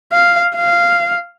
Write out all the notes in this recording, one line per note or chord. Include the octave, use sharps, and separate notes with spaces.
F5
F5